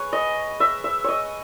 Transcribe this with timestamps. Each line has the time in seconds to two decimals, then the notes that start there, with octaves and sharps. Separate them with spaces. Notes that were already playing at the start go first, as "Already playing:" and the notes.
Already playing: G#4 B4 C#5
0.13 D#5
0.60 E5
0.84 E5
1.04 C#5 D#5